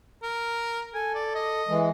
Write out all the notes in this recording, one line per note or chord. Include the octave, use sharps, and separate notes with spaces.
A#4
A4 G#5
D5
D#5
E3 G#3